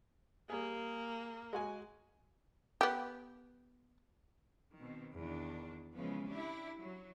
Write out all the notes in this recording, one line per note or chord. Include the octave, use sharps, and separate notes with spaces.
G3 A#3 G#4
G#3 F#4 G#5
B3 G4
B2 D#3 C4
E2 D#3 D4
C#3 E3 F3 G#3 B3
D4 E4 G4
F#3